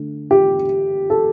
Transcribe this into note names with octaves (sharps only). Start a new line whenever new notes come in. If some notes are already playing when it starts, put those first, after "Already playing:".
Already playing: D3 A3
G4
A4